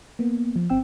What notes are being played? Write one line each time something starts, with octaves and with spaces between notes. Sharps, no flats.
A#3 B3
F3
G1 C4 G5 E6